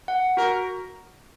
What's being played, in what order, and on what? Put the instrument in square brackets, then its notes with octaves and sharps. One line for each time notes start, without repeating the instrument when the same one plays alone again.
[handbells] F#5
[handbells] F#4 [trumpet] A#4